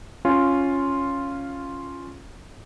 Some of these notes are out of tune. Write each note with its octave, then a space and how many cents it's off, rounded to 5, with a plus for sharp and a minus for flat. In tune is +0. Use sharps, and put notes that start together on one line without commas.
C#4 +0 F4 +0